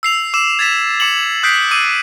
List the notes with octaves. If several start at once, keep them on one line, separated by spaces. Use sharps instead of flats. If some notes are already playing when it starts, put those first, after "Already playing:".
E6 C7 F7
D6 E6 E7
G#6 A6 B6 E7
D6 C#7 E7 F#7
D#6 F#6 G6 B6 C7 D7
D6 E6 D#7